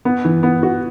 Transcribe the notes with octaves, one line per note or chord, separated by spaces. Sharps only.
B3
E3
B3
F#4